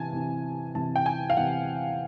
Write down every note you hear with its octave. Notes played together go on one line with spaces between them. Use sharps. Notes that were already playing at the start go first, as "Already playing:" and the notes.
Already playing: C3 E3 G#5 A5
C3 E3
C3 E3 A5
G5
G#5
F5
C3 E3 F#5